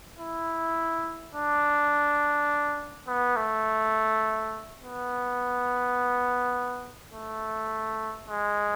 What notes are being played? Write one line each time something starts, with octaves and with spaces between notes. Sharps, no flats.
E4
D4
B3
A3
B3
A3
G#3